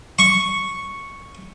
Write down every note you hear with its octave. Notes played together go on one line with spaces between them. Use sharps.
C#6